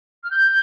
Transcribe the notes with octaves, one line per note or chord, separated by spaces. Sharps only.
F6
G6